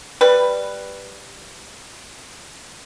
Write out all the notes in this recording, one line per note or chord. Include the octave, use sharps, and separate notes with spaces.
G3 B4